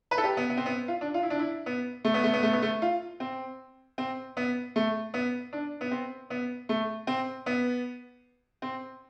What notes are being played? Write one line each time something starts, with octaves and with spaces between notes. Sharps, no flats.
B4
A4
G4
B3
B3
C4
B3
F4
D4
F4
E4
D4
E4
B3
A3
B3
A3
B3
A3
B3
A3
F4
C4
C4
B3
A3
B3
D4
B3
C4
B3
A3
C4
B3
C4